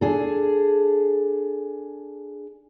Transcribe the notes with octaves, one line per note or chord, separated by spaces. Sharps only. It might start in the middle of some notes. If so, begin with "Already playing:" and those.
D4 G#4 A4